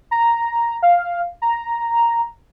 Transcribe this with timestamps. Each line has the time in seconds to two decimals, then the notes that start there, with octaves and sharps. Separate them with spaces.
0.11 A#5
0.82 F5
1.42 A#5